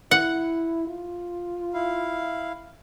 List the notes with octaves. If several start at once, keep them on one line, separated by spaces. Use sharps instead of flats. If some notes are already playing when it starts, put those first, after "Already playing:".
E4 F#5
F4
E4 F5